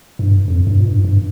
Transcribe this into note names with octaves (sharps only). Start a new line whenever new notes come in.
G2
F2
G2
A#2
G2
G2